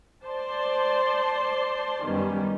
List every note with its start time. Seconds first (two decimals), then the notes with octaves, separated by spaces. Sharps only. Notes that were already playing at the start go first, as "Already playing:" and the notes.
0.24 C5 D5 A5 C6
2.04 F#2 D#3 G3 B3 C#4